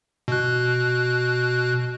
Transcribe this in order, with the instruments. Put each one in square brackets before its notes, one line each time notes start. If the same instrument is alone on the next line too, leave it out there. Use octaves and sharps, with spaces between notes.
[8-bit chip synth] B2 F#6